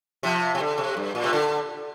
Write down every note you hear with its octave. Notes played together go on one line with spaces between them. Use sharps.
C3 F3
C3
D3
C3
G2
A#2
C3
D3